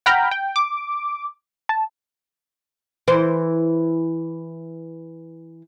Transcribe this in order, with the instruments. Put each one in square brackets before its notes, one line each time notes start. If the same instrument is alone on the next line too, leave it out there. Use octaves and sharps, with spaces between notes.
[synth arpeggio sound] F#5 G5 A#5 B5 F6
G5
D6
A5
[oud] E3 C5